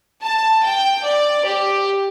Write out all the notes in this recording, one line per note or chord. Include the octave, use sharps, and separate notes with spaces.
A5
G5
D5
G4